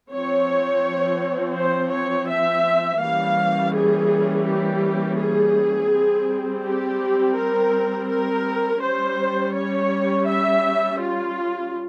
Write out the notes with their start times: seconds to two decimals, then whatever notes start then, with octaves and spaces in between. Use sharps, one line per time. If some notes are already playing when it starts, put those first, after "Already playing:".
0.10 F3 C4 C#5
1.56 C5
1.93 C#5
2.29 E5
3.01 E3 G3 A#3 C#4 F5
3.74 G#4
4.47 G4
5.18 G#4
5.91 G3 C4
6.64 G4
7.36 A#4
8.09 A#4
8.81 G3 C#4 C5
9.53 C#5
10.27 E5
10.99 F4